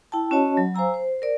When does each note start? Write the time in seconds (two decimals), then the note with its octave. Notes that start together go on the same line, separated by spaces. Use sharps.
0.12 E4 G5 A5
0.31 C#4 F#4 C#5 D#5 A5
0.57 F#3
0.75 C5 F5 G#5 A#5 E6
0.94 C5
1.22 A#4 D5